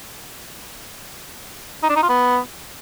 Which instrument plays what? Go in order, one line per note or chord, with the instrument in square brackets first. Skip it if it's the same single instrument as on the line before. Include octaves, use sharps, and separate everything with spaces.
[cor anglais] D#4
D4
D#4
F4
B3